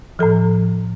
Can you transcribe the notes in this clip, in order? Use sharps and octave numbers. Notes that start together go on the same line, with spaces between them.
A2 F3 A4